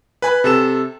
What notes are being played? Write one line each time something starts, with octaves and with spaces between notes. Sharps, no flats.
B4 G#5 B5
C3 A4 E7